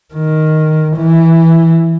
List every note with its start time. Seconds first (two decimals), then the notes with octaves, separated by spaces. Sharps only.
0.14 D#3
0.97 E3